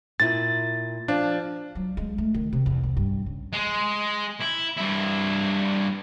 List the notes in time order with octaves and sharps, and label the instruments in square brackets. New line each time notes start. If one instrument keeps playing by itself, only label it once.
[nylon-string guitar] A#2 E4 [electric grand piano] A6
[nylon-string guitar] F3 [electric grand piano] D4
[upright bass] F#3
G#3
A3
D#3
C3
E2
C2
G2
C#3
[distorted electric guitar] G#3
E4
G2 E4